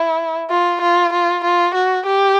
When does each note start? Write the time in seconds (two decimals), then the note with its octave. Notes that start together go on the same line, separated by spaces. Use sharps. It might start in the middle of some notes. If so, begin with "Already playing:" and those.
Already playing: E4
0.50 F4
0.81 F4
1.12 F4
1.44 F4
1.74 F#4
2.06 G4